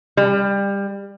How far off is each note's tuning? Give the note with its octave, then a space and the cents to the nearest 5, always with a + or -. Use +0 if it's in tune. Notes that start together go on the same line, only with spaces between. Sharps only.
G3 +25